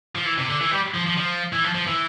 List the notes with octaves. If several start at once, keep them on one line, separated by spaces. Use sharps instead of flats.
F3
E3
C3
D3
E3
G3
F3
F3
F3
E3
F3
F3
E3